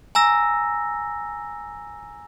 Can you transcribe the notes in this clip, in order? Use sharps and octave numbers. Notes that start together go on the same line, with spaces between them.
G#5 A#5 E6 A#6